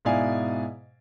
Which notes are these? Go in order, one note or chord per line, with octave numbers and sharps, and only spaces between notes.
G#2 B2 E4 D5 F5 G#5